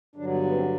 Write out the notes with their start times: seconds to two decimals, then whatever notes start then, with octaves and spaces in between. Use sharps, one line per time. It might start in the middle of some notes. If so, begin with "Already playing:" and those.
0.16 G2 D3 F#3 D4
0.34 B3
0.44 B3
0.52 C4
0.62 B3